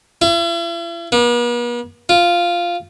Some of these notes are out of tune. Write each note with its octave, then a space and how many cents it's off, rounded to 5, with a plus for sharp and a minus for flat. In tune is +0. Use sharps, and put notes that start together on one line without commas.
E4 +45
B3 -45
F4 -5